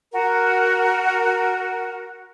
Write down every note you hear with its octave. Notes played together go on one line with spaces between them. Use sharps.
F#4 A#4